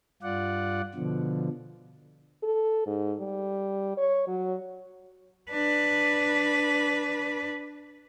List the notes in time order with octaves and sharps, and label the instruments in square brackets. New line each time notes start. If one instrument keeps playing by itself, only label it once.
[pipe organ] G2 F4 D5 F#5
B2 D3 F3
[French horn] A4
G#2
G3
C#5
F#3
[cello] D4 B4